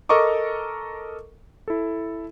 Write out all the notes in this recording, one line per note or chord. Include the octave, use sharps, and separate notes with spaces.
A4 A#4 D#5 A#5 C#6 D6
E4 A4